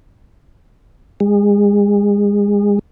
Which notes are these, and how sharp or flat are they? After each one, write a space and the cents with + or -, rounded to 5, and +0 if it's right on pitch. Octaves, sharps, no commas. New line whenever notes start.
G#3 -30